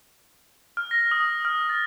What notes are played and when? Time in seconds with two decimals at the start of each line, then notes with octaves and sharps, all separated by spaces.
0.77 F6
0.91 A#6
1.11 D#6
1.45 F6
1.69 A6